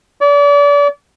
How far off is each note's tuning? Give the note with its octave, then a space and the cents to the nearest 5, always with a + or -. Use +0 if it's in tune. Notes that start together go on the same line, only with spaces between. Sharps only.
D5 -35